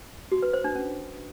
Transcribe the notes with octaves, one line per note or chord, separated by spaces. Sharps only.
F#4
B4
C5
D4
C#4